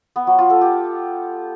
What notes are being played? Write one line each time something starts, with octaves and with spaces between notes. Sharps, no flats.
B3
F#3
F4
A4
G4